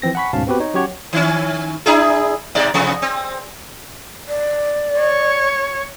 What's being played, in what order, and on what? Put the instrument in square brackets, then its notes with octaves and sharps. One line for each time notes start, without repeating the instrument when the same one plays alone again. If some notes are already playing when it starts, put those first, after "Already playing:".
[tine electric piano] E3 F3 C4 A#6
F#5 G#5 B5 C#6 B6
D2 G#2 B2 C#4 F5 A5
B3 C4 F#4 G4 B4
D#4 C#5
F#3 C#4 G4 C#5 F#5
[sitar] D#3 C#4
D4 E4 G#4
G#2 B2 D5
C3 F3 B3
C4
[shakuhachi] D5
[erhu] C#5